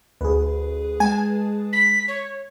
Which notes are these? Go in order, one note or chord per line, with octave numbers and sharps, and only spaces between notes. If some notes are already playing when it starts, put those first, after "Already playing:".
D2 G#4 B4
G#3 G#5 A5
B6
C#5